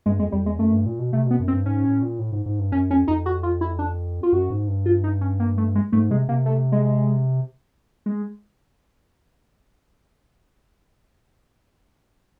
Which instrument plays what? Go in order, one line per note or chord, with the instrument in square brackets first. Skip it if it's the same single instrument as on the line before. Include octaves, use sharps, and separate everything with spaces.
[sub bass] G2 [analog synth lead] G#3
[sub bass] F2 [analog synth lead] G#3
[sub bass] F2 [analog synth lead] G3
[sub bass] E2 [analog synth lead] G#3
[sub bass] F#2 [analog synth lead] A3
[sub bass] G2
A#2
B2
[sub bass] C3 [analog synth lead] A3
[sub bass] B2 [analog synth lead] B3
[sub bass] F#2
[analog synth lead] C4
[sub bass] G2
[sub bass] G#2 [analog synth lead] C#4
[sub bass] A2
A#2
A2
G#2
G#2
G2
[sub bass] F#2 [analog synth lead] C#4
[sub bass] F2 [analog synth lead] C#4
[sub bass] F2 [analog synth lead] D#4
[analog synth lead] F#4
F4
E4
D4
F4
[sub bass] F#2 [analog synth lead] F#4
[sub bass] G#2
G2
[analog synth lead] F4
D#4
C#4
A#3
A3
G#3
[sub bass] G#2 [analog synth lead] A3
[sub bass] C3 [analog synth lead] G#3
[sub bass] C3 [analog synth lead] A#3
[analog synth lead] A3
G#3
G#3